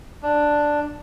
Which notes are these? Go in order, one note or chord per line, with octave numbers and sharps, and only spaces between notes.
D4